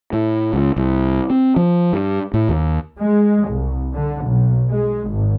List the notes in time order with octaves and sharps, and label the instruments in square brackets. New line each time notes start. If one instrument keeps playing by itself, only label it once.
[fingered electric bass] A2
C#2
C2
C4
F3
G2
A2
D#2
[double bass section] G#3
C2
D3
B1
G#3
G#1